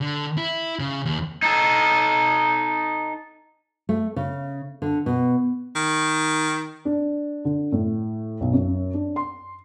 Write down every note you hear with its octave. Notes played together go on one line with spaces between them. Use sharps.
D3
E4
C#3
D#2
D#4 A4
A3
C#3
D3
B2
D#3
D4
D3
A2
B1
F#2
D4
C6